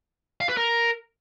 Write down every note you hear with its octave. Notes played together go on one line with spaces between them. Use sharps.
F5
B4
A#4